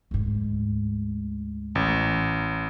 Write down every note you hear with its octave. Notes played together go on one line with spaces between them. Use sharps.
D2 G#2
A1